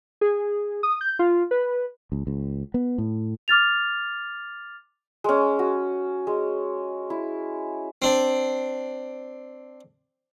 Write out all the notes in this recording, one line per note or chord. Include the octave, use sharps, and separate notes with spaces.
G#4
D#6
G6
F4
B4
C#2
C#2
B3
A2
D6 F6 A6 F7
G#3 C#4
F#4
G#3
E4
C4 D4